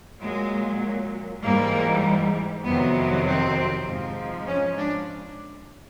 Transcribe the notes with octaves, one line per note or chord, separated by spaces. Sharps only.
A#2 F#3 G#3
G#2 E3 G3 A#3
F2 C3 D#3 F#3 B3
C4
G#2 F3
C#4
D4